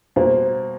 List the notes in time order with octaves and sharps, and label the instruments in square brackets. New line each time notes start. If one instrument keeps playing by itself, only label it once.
[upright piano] B2 G3 A#3 [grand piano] C5